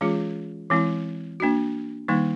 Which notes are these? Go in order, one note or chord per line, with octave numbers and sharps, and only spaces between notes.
E3 G#3 C#4 F4 G#4
E3 G#3 C4 E4
A#3 D4 F#4
D#3 G3 A#3 D#4